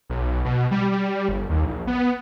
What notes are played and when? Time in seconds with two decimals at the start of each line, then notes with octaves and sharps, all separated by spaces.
0.10 B1
0.45 B2
0.71 G3
0.91 G3
1.29 G1
1.50 D#2
1.65 A#1
1.87 B3